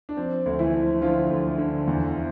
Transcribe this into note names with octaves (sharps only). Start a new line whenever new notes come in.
D4
F3 C4
D2
E3 E4
F3
D3 F3 F4
D2
D3
E2